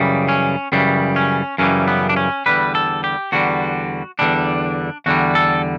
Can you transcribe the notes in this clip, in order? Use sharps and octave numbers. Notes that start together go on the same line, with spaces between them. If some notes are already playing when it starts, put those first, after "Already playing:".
Already playing: F#2 C#3 E3 G3
C#4
F#2 C#3 E3 G3
C#4
F#2 C#3 E3 G3 C#4
B3
D4
C#4
E2 D3 G3 B4
A4
G4
E2 D3 G3 F#4
E2 D3 G3 D4
E2 D3 G3 F#4
A4